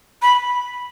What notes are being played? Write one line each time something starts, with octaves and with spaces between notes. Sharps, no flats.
B5